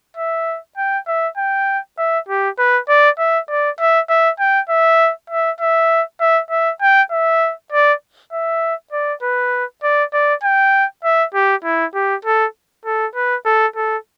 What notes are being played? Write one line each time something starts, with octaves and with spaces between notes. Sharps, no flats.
E5
G5
E5
G5
E5
G4
B4
D5
E5
D5
E5
E5
G5
E5
E5
E5
E5
E5
G5
E5
D5
E5
D5
B4
D5
D5
G5
E5
G4
E4
G4
A4
A4
B4
A4
A4